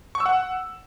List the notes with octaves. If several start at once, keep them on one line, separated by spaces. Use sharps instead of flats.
C#6
E6
F#5